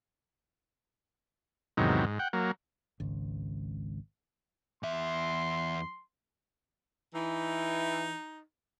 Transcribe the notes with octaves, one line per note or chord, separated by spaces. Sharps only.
E2 G#2 C3 D#3 F#3
G#2
F#5 G5
F#3 A#3
G#1 C#2
E2 E5 C6
E3 D#4